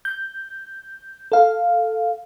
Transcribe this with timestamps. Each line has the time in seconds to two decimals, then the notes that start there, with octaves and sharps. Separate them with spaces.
0.05 G6
1.32 A4 F5